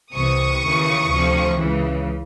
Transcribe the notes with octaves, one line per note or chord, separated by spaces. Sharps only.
C2 C3 E3 C#6 D#6
D#2 C#3 E3
D2 C3 F3
C#2 C#3 E3